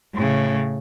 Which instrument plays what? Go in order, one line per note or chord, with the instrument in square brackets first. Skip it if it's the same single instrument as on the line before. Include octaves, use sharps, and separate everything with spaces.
[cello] A2 C#3